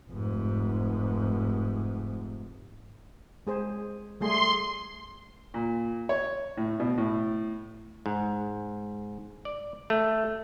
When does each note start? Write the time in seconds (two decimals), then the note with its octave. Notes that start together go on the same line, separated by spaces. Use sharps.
0.10 F1 G#2
3.47 G#3 G#4 C5
4.21 G3 A3 G#4 C6
5.54 A#2
6.09 C#5
6.57 A2
6.80 B2
6.98 A2
8.06 G#2
9.45 D5
9.90 A3